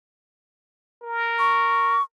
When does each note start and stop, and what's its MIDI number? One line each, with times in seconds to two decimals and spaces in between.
1.02 1.97 70
1.39 2.02 85